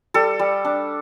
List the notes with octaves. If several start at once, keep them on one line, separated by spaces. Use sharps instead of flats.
G3 A4
G3
D4